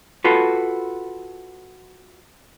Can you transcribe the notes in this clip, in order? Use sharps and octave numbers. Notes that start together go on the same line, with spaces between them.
F4 F#4 A4 B4